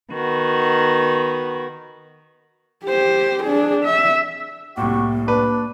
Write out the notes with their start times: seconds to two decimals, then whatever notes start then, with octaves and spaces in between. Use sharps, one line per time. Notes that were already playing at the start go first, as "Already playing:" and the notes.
0.12 D#3 B3 F#4
2.85 G4 C5
3.43 D4 G#4
3.83 E5
4.77 C2 A2 A#3 F#4 G4 C#6
5.28 D4 B4